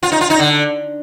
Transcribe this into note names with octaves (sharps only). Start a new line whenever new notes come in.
F4
D#4
F4
D#4
D3